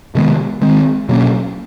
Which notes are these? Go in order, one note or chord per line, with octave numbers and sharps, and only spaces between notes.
C3 D#3 G#3 B3
D#3 G#3 C4
B2 F#3 A#3 C#4